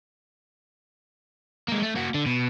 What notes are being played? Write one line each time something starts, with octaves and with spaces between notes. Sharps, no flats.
G#3 A#3
A3
A#3 F#4
D3
B2